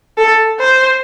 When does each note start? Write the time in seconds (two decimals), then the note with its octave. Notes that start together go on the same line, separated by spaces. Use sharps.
0.18 A4
0.59 C5